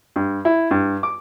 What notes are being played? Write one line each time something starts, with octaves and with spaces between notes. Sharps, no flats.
G2
E4
G2
D6